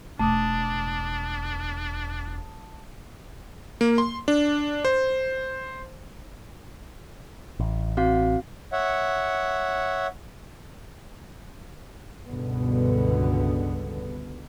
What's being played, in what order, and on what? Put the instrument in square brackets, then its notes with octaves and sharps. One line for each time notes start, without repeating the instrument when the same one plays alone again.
[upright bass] E1 [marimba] A3 [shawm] D4 [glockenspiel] A5 D6 D#6
[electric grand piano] A#3
C6
D4
C5
[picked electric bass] A1
[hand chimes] C4 F#4 F5
[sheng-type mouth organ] C#5 E5 F#5
[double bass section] C#2 G2 B2 D3 B3